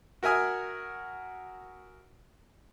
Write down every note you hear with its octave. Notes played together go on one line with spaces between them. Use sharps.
F#4 A#4 E5 G#5 D#6